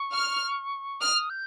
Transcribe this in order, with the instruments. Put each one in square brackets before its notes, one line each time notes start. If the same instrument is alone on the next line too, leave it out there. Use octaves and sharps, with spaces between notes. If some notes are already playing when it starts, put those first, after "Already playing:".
Already playing: [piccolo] C#6
[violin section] F6
[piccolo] D#6 [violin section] F6
[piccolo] G6